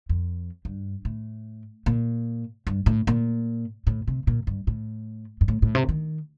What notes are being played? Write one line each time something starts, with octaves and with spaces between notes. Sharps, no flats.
F2
G2
A2
A#2
G2
A2
A#2
A2
C3
A#2
G2
A2
G2
A2
A2
C3
D#3